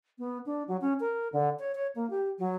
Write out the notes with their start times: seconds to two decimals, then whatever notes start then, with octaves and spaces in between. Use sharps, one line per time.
0.19 B3
0.46 D4
0.68 F#3
0.81 C#4
1.00 A#4
1.33 D3
1.59 C#5
1.75 C#5
1.95 A#3
2.10 G4
2.39 F#3